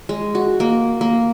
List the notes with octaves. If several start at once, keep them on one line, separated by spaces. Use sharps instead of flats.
G#3
F#4
A#3
A#3